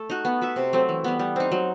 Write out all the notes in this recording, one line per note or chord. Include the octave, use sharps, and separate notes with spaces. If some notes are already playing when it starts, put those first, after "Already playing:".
Already playing: A3 A4
D#4 F#4
B3
F#4 B4 E5
C3
F#3 A3 C4
E3
G3 B3
G3
C4 D#4
F#3